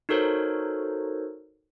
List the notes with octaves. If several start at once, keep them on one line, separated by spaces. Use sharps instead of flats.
D#4 F#4 A4 A#4 C5 C#5